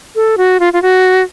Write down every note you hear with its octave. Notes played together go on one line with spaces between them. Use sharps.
A4
F#4
F4
F4
F#4